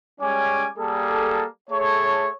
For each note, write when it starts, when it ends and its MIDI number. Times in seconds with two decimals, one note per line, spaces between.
0.21 0.67 55
0.21 0.67 56
0.21 0.67 61
0.21 0.67 73
0.21 0.67 80
0.21 0.67 86
0.78 1.44 55
0.78 1.44 58
0.78 1.44 68
0.78 1.44 69
1.70 2.29 57
1.70 2.29 68
1.70 2.29 69
1.70 2.29 73